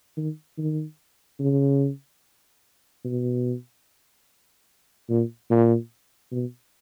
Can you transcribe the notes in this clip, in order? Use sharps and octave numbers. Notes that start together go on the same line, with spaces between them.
D#3
D#3
C#3
B2
A#2
A#2
B2